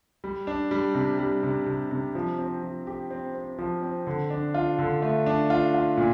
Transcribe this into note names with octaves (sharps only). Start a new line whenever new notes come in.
G3
D4
G3
C3
G3
C3
C3
C3
F3
C4
F3
G4
C4
C4
F3
C4
D3
D4
F4
D3
A3
D4
F4
F4
A#2